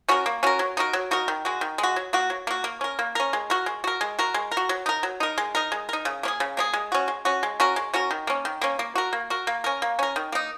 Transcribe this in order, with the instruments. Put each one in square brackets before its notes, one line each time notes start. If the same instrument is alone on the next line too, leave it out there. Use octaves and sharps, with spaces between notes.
[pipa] C#4 F#4 A#4
A#3
C#4 F#4 A#4
F#3
D#4 F#4 A#4
F#3
D#4 F#4 A#4
D#3
G#3 F#4
D#3
G#3
F#4
F#3
A#3 F#4
F#3
A#3 F#4
A#3
C#4 A#4
A#3
C#4 A#4
G#3
F#4 A#4
G#3
F#4 A#4
G#3
F#4 A#4
G#3
A#4
F#4
F#3
D#4 A#4
F#3
D#4 A#4
G#3
D#4 A#4
G#3
D#4 A#4
C#3
A#3 C#4
G#4
C#3
A#3 C#4 G#4
G#3
C#4 F#4
G#3
C#4 F#4
G#3
C#4 F#4 A#4
G#3
C#4 F#4 A#4
D#3
A#3 C#4
D#3
A#3 C#4
A#3
F#4 A#4
A#3
F#4 A#4
A#3
C#4 A#4
A#3
C#4 A#4
D#3
A#3 D#4